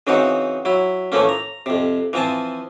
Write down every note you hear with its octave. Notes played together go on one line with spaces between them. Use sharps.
C#3 E3 C4 D#4 F#4
F#3 E4
E3 F3 A3 A#3 C#4
A#5
F2 C3
E3 F3 C4 G#5 A5